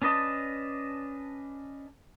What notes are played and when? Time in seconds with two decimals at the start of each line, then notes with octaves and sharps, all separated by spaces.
0.02 C#4 D4 B4 D#5 A5